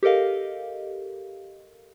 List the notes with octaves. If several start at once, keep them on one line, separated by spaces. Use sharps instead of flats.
G4 A4 A#4 D#5 F5